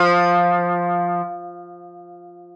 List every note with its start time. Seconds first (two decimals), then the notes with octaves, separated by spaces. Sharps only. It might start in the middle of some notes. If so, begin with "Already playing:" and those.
Already playing: F3